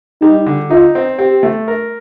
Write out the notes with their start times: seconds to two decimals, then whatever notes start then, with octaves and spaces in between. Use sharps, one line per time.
0.22 G3 D#4
0.46 D3
0.70 D#4 F4
0.95 C4
1.19 C4 G4
1.43 A3
1.68 A#4